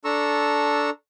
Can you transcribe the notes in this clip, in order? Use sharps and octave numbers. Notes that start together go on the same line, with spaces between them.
D4 A4 A#5 C#6 E6